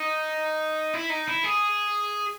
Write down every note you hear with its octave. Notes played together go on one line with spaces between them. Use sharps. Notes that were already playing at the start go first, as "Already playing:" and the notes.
Already playing: D#4
E4
D#4
E4
G#4